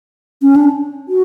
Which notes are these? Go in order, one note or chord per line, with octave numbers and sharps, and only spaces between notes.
C#4
D4
F#4